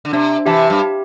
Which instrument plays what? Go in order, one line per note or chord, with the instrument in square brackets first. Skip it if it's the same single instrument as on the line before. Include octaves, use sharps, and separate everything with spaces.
[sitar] D3
[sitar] C3 [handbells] D4
[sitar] C3 E3 [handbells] G4 E5 A5
[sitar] G2
[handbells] G4